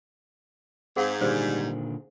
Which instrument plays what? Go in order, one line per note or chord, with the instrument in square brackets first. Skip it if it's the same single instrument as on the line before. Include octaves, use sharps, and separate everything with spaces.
[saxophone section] G#2 [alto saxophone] C4 [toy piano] G#4 F5 F#5
[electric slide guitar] A#2 D3 D#3 [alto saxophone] G3 [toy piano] C5